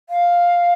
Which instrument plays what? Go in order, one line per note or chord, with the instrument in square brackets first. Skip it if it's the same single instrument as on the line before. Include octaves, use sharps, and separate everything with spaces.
[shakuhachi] F5